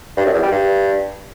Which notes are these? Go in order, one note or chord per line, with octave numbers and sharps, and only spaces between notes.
G2
F#2
E2
G3
G2